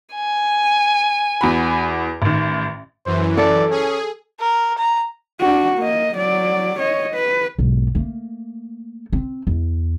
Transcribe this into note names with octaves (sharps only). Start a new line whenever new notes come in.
G#5
E2 F#4 B5
A1 D#3
F#2 E3 C5
A4 D5
C#4 G#4
A#4
A#5
D4 F#4
A#3 D#5
F#3 D5
C#5 D#5
B4
B1 G#2
A3 A#3
C4
E2